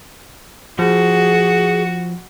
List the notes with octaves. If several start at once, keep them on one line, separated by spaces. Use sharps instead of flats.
F3 F#4 G#4